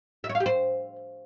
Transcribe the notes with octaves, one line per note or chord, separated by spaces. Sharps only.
E5
C#5
F5
G4
C5